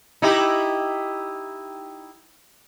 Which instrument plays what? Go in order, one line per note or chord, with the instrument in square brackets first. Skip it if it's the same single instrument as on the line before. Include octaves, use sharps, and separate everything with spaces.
[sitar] D#4 E4 G4